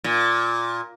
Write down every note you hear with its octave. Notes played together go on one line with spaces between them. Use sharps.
A#2